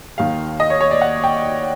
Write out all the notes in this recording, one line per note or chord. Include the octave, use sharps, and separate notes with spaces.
D#2 D#3 F5
D#5
C#5
C#5
D5
F#5
G5